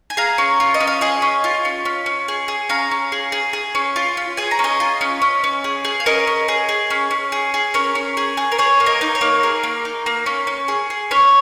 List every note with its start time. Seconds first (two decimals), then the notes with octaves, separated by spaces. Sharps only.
0.10 G#5
0.17 G#4 F5 A#5
0.38 C#4
0.60 F4
0.74 D#5
0.80 C#4
0.87 F5
1.01 G#4 D#5 G#5
1.22 C#4
1.44 F4
1.65 C#4
1.85 C#4
2.06 C#4
2.28 G#4
2.48 G#4
2.69 C#4 F5 A#5
2.91 C#4
3.12 G#4
3.32 G#4
3.53 G#4
3.75 C#4
3.96 F4
4.17 C#4
4.37 G#4 G#5
4.51 A#5
4.59 C#4
4.64 D#5 G#5
4.80 F4
5.01 C#4
5.22 C#4
5.44 C#4
5.64 G#4
5.85 G#4
6.00 F5
6.06 C#4 A#4 D#5
6.27 C#4
6.48 G#4
6.69 G#4
6.90 C#4
7.11 C#4
7.32 G#4
7.54 G#4
7.74 C#4 A#4
7.95 C#4
8.17 G#4
8.37 G#4
8.52 A#4
8.59 G#4 C#5
8.80 A#3
8.86 A#4 D#5
9.01 D#4
9.15 C#5
9.21 A#3
9.43 G#4 A#4
9.63 A#3
9.85 D#4
10.06 A#3
10.26 C#4
10.47 C#4
10.68 G#4
10.90 G#4
11.11 C#4 C#5